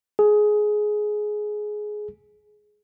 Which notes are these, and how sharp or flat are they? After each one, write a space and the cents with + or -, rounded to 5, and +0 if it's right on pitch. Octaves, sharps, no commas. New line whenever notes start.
G#4 +15